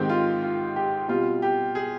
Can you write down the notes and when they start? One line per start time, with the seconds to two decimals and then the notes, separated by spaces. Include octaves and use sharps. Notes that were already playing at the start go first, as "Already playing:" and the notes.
Already playing: G#2 D#3 G#3 C4 G4
0.09 F4
0.43 F4
0.76 G4
1.08 B2 G3 C4 F4
1.42 G4
1.75 G#4